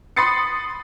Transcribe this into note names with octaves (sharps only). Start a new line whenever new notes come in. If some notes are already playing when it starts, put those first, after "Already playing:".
B5 C6 D#6 A6 C7 C#7